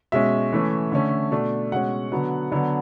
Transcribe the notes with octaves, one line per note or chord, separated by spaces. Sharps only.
B2 G#3 C#4 E5
E3 A3 C#4
D3 A3 C#4
B2 A3 D4
B2 G#3 C#4 F#5
D3 F#3 B3
D3 F#3 B3 D4